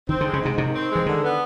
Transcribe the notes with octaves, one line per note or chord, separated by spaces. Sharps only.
D#3 C4
D3
G#3
C#3
G#2 C3
C3 D#3
C4
G#3
E3
D3 D#3
B3